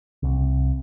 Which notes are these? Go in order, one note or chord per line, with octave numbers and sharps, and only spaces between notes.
C2